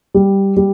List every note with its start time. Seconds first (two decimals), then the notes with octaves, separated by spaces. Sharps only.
0.14 G3
0.57 G3